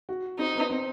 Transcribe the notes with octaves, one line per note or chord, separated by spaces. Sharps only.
F#4
C4 D#4
B3
C4